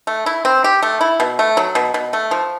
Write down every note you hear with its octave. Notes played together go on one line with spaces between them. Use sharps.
A3
E4
C4
G4
A3
E4
B2
A3
F#3
B2
B2
A3
F3